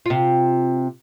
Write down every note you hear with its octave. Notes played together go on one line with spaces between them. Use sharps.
C3 F4